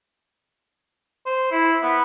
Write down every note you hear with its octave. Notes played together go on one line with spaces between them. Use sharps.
C5
E4
B3